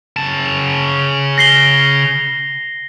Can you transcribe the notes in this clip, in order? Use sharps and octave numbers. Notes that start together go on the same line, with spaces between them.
C#3 A5
A#6 C7 G7